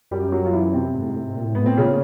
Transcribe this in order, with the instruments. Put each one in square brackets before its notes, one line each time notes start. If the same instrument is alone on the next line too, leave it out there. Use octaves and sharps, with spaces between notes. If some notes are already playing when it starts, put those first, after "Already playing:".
[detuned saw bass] F#2 [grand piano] G3 G4
[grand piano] F#3 F#4
F4
E3 E4
C3 C4
[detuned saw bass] G#2
A2
G#2
A2
G#2
A#2
A2
[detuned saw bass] G#2 [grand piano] B3
[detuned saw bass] A2 [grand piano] C4
[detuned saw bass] A#2 [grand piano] C#3 C#4